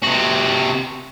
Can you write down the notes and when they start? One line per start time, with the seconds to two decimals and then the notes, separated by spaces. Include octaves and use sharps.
0.03 C3 F#4